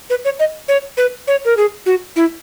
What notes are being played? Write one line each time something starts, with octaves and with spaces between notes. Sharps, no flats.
B4
C#5
D#5
C#5
B4
C#5
A#4
G#4
F#4
E4